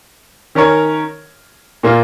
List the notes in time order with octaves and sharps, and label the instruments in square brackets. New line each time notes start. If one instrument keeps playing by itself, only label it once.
[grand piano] D#3 C#4 A#4 C#5
A#2 A#3 F4